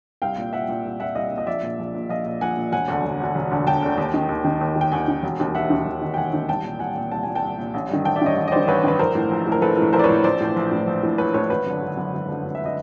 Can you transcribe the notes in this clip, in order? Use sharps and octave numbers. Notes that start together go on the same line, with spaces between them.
C2 F5 G5
A#2
C2 E5 F#5
A#2
C2
A#2 E5 F#5
C2 D#5 F5
A#2
D#5
A#1 D5 E5
A#2
A#1
A#2
A#1 D#5 F5
A#2
A#1 F#5 G#5
A#2
E1 F#5 G#5
D2 D3
E1
D2 D3
E1
D2 D3
E1 G5 A5
D2 D3
D#2
D#3
D#2
D#3
D#2
D#3 G5
D#2 F#5 G#5
D#3
E1
D#2 D#3
E1 E5 F#5
D#2 D#3
E1
D#2 D#3
G5
E1 F#5 G#5
D#2 D#3
C2 G5 A5
A#2
C2 F#5 G#5
A#2
C2 A5
A#2 G#5
G5 A5
C2
A#2
A1
G2 D#3
A1 G5 A5
D5 E5
G2 D#3 C#5 D#5
A1
D#5
G2 D#3 C5 D5
A1 B4 C#5
G2 D#3 B4
A#1 A#4 C5
A2 E3
A#1
A2 E3
A#4
A#1 A4 B4
A2 E3
A#1 A#4 C5
D5
B4 C#5
A2 E3
A#1 C5 D5
A2 E3
A#1
A2 E3
A#1
A2 E3
A#1 B4 C#5
A2 E3 B4 C#5
G#1 B4 C#5
F#2 D3
G#1
F#2 D3
G#1
F#2 D3
G#1
E5
D3 D#5